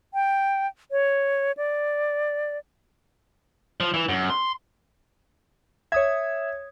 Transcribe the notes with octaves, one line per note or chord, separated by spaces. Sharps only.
G5
C#5
D5
F3
E3
F#2
C6
C#5 E5 D#6 G#6